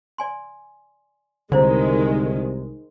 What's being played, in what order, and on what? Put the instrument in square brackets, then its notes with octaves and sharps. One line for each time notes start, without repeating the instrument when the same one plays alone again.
[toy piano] D5 G#5 C6
[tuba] C2 [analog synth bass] D3 [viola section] D#3 G#3 [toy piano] E4 C5 D5